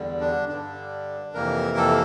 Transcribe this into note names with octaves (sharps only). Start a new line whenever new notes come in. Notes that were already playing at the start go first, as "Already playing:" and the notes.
Already playing: E2 D3 G3
D4
G2 D3 G3 D4
F2 C3 E3 A#3 A#4
A4